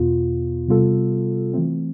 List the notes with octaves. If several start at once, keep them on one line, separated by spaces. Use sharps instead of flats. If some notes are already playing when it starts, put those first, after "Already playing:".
Already playing: E2 B2 B3 F4
C3 G3 B3 F4 A4
E3 A3 C4